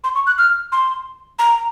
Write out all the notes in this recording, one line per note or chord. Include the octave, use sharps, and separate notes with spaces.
C6
C#6
F#6
F6
C6
A#5